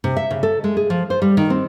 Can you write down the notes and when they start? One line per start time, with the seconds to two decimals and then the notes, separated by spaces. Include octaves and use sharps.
0.04 C3
0.17 E5
0.31 C#3
0.43 A4
0.64 G#3
0.77 G#4
0.90 F3
1.10 C5
1.22 G3
1.37 D#3
1.50 C4